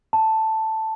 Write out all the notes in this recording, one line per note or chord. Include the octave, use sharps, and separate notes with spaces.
A5